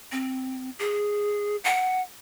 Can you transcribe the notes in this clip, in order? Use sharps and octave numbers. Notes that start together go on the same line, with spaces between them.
C4
G#4
F#5